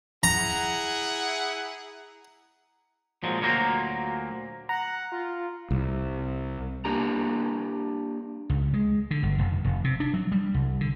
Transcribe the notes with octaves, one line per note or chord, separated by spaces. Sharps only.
E4 G#4 F#5 A#5
A#2 F3 F#3 G#3
D2 A#2 F#3 A#3 C5 A#5
F#5 A#5
F4
C2
A#3 D4 G4 A#5
C#2
G#3
D3
G1
F1
F1
C3
D4
F#3
G3
C2
D3